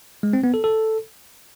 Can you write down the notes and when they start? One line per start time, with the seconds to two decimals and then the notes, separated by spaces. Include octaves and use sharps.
0.23 G#3
0.33 C4
0.44 B3
0.54 A4
0.64 A4